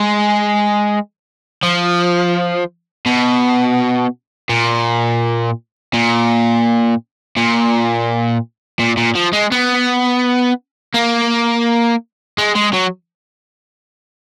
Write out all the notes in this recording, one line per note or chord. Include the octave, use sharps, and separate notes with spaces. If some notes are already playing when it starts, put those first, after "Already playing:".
Already playing: G#3
F3
B2
A#2
A#2
A#2
A#2
A#2
F3
G#3
B3
A#3
G#3
G#3
F#3